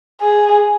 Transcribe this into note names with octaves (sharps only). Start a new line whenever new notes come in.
G#4